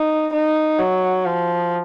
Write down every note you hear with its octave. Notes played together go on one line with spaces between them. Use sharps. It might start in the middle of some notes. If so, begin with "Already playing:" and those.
Already playing: D#4
D#4
F#3
F3